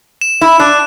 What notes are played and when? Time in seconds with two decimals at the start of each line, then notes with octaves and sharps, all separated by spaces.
0.21 E7
0.41 E4
0.59 D4 F#6